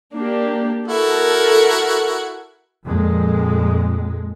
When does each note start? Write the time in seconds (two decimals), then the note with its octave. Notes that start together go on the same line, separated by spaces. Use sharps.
0.14 A#3 D4 G4
0.88 E4 F#4 A4 A#4
2.84 F2 A#2 G#3